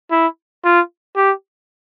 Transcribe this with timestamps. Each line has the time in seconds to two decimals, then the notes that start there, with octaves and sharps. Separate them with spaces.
0.11 E4
0.64 F4
1.16 G4